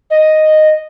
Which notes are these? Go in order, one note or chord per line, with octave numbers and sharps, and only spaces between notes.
D#5